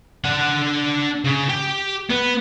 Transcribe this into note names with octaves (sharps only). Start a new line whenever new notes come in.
D4 F#5
C#3
G4
B3